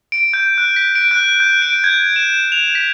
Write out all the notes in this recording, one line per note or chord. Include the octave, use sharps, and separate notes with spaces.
D7
G6
F#6
B6
D7
F#6
G6
D7
G#6
E7
F7
B6